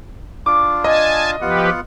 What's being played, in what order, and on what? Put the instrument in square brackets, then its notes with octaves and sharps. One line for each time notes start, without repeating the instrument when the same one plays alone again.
[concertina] D4 F4 [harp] D6
[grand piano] D#5 [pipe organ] G#5 A5
[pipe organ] F3 G4 B4 [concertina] B3 F4 F#5